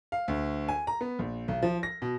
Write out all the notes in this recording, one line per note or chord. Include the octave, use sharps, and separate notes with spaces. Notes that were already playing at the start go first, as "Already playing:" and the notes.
F5
D2
G#5
A#5
B3
A#1
B1
F3
A#6
B2